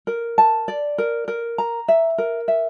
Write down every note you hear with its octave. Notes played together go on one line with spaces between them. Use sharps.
A#4
A5
D5
A#4
A#4
A#5
E5
A#4
E5